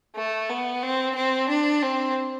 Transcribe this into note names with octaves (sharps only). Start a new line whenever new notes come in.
A3
B3
C4
C4
D4
C4